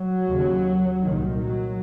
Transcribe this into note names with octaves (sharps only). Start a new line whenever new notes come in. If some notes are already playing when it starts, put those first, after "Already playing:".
Already playing: F#3
D#2 C#3
C2 A#2 D#3
F#3